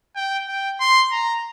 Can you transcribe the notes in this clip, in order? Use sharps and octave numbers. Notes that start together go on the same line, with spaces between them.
G5
G5
C6
A#5